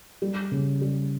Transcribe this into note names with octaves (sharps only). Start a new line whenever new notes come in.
G3
C#3
G3